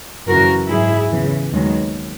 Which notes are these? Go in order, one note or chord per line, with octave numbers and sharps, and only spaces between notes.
F#2 C#3 E3 F#4 A#4
G#2 F#3 E4 G#4
E2 C#3 E3
D#2 D#3 F#3 G#3 B3